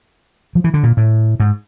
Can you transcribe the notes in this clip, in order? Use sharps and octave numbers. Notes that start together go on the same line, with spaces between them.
F3
E3
D3
A#2
A2
G#2